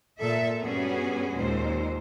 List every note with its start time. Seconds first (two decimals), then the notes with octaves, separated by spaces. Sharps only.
0.18 A#2 A4 E5
0.61 G2 G3 B3 C#4 F#4 G#4
1.35 D#2 A#2 G#3 C5